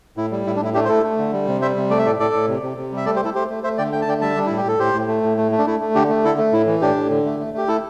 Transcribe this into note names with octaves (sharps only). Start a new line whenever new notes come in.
A2 E4
G3
A2 E4
D4
A2 E4
A3 D4 G4
C5
A3 E4 A4
A3
D3
G3
C3
G3 C5 E5
C3
A3 D5
E5
A2 A4 D5
A2 A4 D5
A2
C3
C3
C3
G3
E5
A3 A4 D5
G4 C5
A3 E4 A4
A3 G4 C5
A3
A3 C5 E5
D3 D5 G5
A3 G5
A5
D3 D5 G5
G3 E5 A5
G3 D4
A2 E4
G4
A2 A4
A2 G4 C5
A2
A3
A2
A3
A3
D4
A3 E4
A3
D3 D4 G4
A3
D3 E4 A4
A3
A2 E4
E3
A2 D4 G4
A2
D3
A3
A3
A3 G4
A3 E4 A4